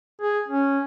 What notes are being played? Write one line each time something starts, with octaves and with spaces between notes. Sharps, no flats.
G#4
C#4